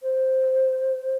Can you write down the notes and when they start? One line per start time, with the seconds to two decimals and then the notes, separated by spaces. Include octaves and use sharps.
0.02 C5